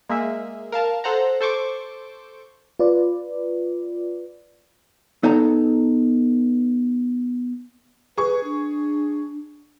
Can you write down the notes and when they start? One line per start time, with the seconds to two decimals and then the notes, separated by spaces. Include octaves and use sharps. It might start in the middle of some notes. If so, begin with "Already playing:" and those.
0.09 G#3 A#3 G#4 E5
0.72 A#4 F5 A5
1.04 A4 C5 F#5 A#5
1.41 A4 C5 C#6 D6
2.79 F4 B4 D5
5.23 B3 D#4 A4 A#5
8.17 G#4 B4 C#6
8.44 D4